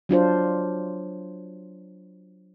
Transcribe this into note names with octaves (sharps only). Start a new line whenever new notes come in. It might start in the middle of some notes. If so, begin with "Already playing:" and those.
F#3 D4 F4 C5